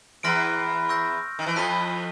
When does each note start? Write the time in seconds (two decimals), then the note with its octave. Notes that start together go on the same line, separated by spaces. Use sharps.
0.23 E2 E3 C6 F6 A#6 D7
0.89 C#6 E6 G6 A#6
1.39 D#3
1.46 E3
1.55 F2 F3 F#6 B6 D#7 G7